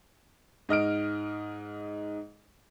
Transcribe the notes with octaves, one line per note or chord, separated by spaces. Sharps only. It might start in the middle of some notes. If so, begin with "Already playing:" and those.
G#2 D#5 F6 D7